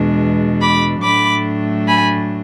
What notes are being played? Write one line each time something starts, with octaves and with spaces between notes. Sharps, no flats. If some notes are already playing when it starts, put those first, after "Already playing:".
Already playing: E2 B2 G#3 D4
B5 D6
A2 F#3 A3 D4 B5 D6
G#5 B5